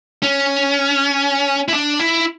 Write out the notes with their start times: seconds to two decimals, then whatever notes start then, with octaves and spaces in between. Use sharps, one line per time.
0.23 C#4
1.68 E4
1.74 D4
1.99 E4